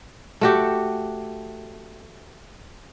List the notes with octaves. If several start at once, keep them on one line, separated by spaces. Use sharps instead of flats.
A3 F#4 G4